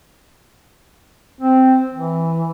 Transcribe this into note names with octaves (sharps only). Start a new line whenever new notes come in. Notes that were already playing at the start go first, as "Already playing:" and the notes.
C4
E3